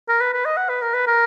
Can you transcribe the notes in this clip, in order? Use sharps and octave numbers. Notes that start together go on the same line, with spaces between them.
A#4
B4
B4
D#5
F#5
B4
A#4
B4
A#4